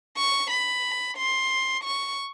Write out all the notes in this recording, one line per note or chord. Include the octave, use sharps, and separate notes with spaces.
C#6
B5
C6
C#6